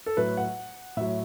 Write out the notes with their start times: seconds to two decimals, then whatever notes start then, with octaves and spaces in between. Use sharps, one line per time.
0.06 A4
0.17 A2 F#3 B4
0.37 F#5
0.97 A2 F#3 E5